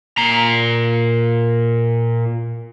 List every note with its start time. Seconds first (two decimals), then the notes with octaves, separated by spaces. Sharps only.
0.18 A#2 A#5